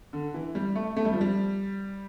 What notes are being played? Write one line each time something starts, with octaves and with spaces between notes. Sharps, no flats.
D3
E3
G3
A3
A3
G3
F3
G3